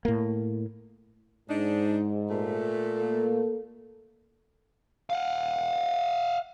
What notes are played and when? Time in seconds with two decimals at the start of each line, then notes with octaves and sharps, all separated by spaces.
0.05 A2 A#3
1.49 G#2 D4 D#4
2.30 A#2 A3
2.98 A#3 A4
5.10 F5 F#5